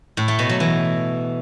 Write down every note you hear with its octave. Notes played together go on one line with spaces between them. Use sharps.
A2
A3
B2
F#3
E3